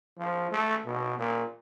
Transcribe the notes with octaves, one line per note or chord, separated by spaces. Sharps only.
F3
A3
B2
A#2